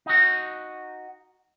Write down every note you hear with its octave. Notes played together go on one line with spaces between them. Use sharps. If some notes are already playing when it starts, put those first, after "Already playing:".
D#4 F#4